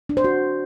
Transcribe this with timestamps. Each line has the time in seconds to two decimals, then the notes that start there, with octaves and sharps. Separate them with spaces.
0.09 D4
0.17 C5
0.24 F#4